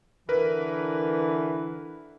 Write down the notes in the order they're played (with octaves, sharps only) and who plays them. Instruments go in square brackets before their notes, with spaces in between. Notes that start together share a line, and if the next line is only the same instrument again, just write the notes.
[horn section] D3 E3 [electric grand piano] A#4 B4